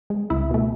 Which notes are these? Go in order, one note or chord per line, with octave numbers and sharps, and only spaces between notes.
G#3
C#2 E4
B2 A3